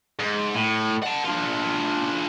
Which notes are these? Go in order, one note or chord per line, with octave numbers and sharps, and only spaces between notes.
G#2
A2
F#5 A5
D4 F4